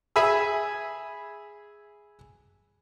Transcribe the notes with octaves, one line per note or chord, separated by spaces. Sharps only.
G#4 E5 G#5 B5 E6